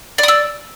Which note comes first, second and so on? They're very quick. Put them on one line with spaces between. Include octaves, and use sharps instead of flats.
D5 D#6 E6